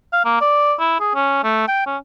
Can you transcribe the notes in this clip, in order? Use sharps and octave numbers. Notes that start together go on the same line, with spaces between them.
F5
A#3
D5
E4
G#4
C#4
A3
G5
C#4